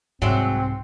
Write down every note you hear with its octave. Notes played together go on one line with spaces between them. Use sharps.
C2 G#2 F#3 G#3 C4 E5